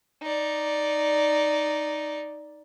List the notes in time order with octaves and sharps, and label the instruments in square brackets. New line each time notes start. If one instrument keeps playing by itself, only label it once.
[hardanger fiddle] D#4 D5